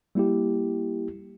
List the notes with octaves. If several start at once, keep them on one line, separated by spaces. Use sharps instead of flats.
G3 A#3 E4 G4